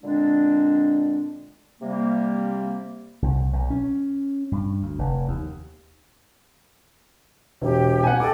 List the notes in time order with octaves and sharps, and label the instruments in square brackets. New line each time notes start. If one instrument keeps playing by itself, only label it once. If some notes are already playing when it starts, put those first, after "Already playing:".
[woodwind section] A#2 D3 G#3 C4 D4
C3 G3 A#3
[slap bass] C2
B1
C#4
G2
D2
F1
D#2
[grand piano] E1 [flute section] G4
[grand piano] F#5 G#5
[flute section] G4 A4 D#5 [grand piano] D6